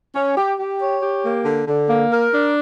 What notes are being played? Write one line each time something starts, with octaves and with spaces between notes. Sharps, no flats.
C#4
G4
G4
C#5
G4
A#3
D3
D3
A#3
A#4
D4